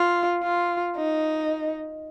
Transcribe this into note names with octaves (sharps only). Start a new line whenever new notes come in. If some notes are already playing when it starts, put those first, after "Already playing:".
Already playing: F4
F4
D#4